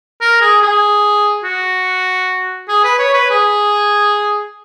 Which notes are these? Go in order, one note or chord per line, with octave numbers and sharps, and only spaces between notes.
A#4
G#4
G#4
F#4
G#4
B4
C#5
B4
G#4